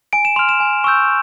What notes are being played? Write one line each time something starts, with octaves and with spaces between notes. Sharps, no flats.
G#5 D7
E7
C6 F6 F7
E7
G#5
C#6 E6 G6